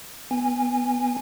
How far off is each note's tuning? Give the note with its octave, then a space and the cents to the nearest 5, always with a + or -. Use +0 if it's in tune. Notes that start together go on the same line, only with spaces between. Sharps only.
B3 +0 G#5 -15